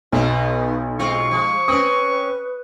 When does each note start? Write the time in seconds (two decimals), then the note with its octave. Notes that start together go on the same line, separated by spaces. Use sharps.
0.12 B1 B2 B3 D#4
0.99 G#3 C4 F4 C#6
1.31 F3
1.68 C4 C#4 B4 D#6